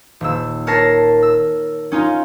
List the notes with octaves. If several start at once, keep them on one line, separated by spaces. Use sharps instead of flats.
D#1 E6
A#4 C#5 A5 A#6 C7
E6
C#4 D#4 F4